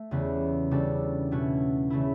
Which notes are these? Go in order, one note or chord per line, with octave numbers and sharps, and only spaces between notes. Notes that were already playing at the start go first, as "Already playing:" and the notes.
Already playing: A3
E2 C#3 G3 B3
C#3 G3 D4 F#4 A4
B2 A3 C#4 F#4
C#3 E3 A3 E4